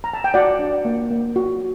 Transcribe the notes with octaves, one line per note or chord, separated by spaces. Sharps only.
A#5
A5
G5
F#4 D5 F#5
D4
A#3
A#3
F#4